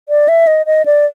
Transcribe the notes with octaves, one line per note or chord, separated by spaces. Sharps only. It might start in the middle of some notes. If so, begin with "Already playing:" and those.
D5
E5
D#5
D#5
D5